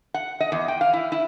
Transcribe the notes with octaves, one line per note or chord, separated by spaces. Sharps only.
F#5
D#5
E2
G5
F5
E4
E4